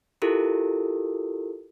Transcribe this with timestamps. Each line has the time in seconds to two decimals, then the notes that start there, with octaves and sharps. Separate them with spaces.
0.22 E4 F4 G4 A4 A#4